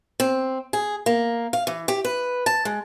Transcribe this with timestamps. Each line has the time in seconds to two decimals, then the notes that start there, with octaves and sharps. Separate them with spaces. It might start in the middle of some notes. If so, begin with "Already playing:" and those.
0.20 C4
0.73 G#4
1.06 A#3
1.53 F5
1.67 E3
1.88 G4
2.05 B4
2.46 A5
2.65 G#3